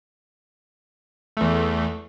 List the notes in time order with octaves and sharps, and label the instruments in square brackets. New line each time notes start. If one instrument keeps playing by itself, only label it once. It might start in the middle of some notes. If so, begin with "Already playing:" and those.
[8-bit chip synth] E2 A3